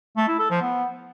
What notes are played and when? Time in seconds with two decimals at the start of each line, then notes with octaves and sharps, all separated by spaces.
0.17 A3
0.28 E4
0.39 A4
0.50 F3
0.61 B3